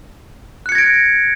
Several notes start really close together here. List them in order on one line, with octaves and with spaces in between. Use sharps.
F#6 C#7 G#6 A#6 D7